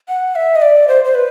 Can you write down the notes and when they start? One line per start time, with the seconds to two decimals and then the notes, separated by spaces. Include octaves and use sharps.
0.09 F#5
0.36 E5
0.56 D#5
0.62 D5
0.88 C5
1.04 C5
1.15 B4